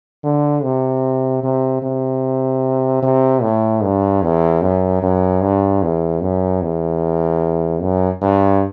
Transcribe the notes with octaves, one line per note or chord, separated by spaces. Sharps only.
D3
C3
C3
C3
C3
A2
G2
E2
F#2
F#2
G2
E2
F#2
E2
F#2
G2